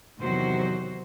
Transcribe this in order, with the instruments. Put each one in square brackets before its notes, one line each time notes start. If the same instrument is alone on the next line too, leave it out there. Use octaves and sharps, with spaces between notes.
[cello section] E2 C3 D#3 F#3 F#4 C5